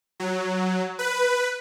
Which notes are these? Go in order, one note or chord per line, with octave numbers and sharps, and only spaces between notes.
F#3
B4